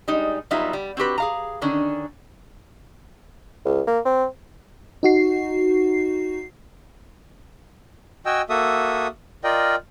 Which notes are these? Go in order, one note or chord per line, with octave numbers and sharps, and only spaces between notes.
G3 G#3 D#4
F#3 G3 B3 D#4 F4 E5
G3
C4 F#4 G4 B4
G#4 F5 A#5
D3 D#3 C#4 D4
C#2
A#3
C4
D#4 F#4 C7
F#4 D#5 G5 G#5 E6
A#3 F#4 A4 E5 D#6
F4 A#4 D5 D#5 G5